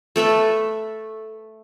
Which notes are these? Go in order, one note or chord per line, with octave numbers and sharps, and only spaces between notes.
A3 A4 B4 E5